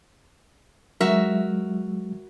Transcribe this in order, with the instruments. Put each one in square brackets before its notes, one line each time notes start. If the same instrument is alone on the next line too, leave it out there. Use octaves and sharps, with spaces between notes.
[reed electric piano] F#3 G#3 [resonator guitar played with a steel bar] F#4 A#4 E5